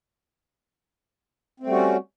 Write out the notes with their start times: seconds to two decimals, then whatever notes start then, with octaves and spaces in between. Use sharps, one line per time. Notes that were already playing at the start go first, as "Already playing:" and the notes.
1.60 C4
1.63 A3
1.67 G3
1.70 F#4
1.73 C#4